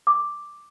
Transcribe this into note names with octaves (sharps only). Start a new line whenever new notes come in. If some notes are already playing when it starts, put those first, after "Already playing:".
D6